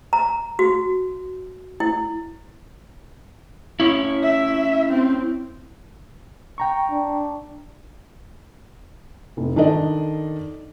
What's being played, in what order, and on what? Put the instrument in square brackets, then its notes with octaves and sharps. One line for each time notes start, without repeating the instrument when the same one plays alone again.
[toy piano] A#5
F#4
E4
[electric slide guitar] C#4 E4
[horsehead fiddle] E5
C4
[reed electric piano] G5 A#5 C#6
[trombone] D4
[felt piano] F1
D#3 D4 A4 D5 D#5